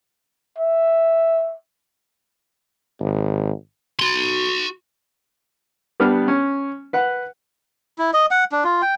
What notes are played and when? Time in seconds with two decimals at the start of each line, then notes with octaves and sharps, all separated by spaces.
0.58 E5
3.00 G#1
3.99 F#4 C6
6.00 G3 B3 D4 F6
6.28 C#4
6.93 B4 F#5
7.98 E4
8.13 D#5
8.31 F#5
8.52 D4
8.64 F4
8.82 G5